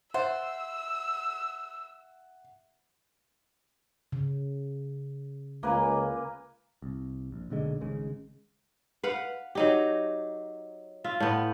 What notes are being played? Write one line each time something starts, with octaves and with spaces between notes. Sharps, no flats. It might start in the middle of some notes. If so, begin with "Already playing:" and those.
C5 E5 F#5 E6
C#3
C#2 A#3 B4 G#5
C2
A#1
B1 A#2 D3 G#3
G#1 G#2 C#3 G#3
B4 F5 F#5
F#3 D#4 G4
F4 E5
A2 B3